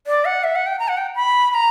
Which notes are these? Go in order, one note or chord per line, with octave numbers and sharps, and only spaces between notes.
D5
F#5
E5
F#5
G5
A#5
F#5
G5
B5
B5
A#5